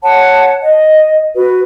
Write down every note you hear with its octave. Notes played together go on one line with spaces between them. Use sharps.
C#5 F#5 A5
D#5
F#4 B4